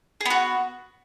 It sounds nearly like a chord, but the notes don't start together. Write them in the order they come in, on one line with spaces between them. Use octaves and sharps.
G#4 B3 F#4